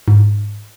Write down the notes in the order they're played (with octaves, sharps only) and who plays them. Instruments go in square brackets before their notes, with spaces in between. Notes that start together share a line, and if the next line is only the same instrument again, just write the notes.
[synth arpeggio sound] G#2